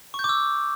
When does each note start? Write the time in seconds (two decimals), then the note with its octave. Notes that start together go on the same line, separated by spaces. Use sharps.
0.14 C#6
0.19 G6
0.24 D6
0.29 E6